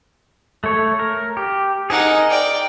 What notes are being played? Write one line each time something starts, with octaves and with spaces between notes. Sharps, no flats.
A3 C#5
A#4
G4
D#4 G#4 A#4 F#5
D5 G5